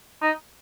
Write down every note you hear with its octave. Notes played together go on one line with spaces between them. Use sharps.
D#4